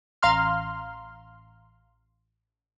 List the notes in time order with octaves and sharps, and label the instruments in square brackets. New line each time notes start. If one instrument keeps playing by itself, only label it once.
[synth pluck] A1 F5 A#5 C6 F6